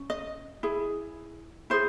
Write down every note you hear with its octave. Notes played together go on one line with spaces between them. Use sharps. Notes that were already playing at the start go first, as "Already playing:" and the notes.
Already playing: C#4
D#5
E4 G#4
E4 G#4 C5